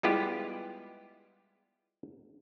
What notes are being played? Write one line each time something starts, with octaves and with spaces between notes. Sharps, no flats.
G3 G#3 B3 E4 F4 G4